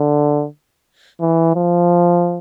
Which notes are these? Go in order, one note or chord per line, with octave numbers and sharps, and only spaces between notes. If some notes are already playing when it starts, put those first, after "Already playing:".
Already playing: D3
E3
F3